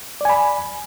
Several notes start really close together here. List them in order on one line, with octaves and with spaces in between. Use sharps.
D5 G#5 B5